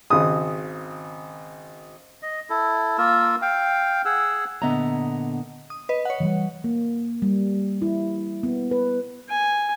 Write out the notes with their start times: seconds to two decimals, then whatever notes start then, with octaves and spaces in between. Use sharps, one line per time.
0.10 G#1 C#3 D#6
2.22 D#5
2.50 E4 A4
2.98 A#3 F4 A#4 E6
3.42 F5 G5
4.05 G#4 F#5 E6
4.62 A#2 D3 B3 D#5 E5 A#5
5.70 D#6
5.89 B4 D#5
6.05 C#5 F#5
6.20 E3 F3 G3
6.64 A#3
7.22 G3
7.82 E4
8.43 B3
8.71 B4
9.28 G#5